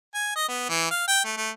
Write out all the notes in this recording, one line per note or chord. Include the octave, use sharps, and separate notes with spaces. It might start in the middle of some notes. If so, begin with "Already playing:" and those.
G#5
D#5
B3
E3
F5
G5
A3
A3